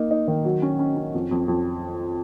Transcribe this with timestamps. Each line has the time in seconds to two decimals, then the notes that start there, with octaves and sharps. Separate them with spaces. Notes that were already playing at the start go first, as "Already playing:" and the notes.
Already playing: A#3 D#4
0.11 D#4
0.28 D#3
0.45 F#3
0.62 C#4
0.79 C#4
0.97 C#4
1.14 F2
1.31 F2
1.48 F2